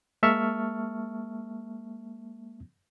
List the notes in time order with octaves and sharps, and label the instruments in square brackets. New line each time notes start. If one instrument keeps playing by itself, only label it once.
[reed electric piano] G#3 A#3 E5 A5 C#6 F6